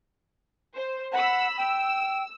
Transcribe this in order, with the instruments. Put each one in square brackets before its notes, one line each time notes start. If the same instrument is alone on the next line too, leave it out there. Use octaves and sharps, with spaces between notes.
[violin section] C5
[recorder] F#5 [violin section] B5 E6
[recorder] G5 [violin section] E6